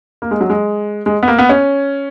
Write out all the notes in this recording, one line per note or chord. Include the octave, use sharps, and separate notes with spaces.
A#3
G#3
F#3
G#3
G#3
B3
A#3
B3
C#4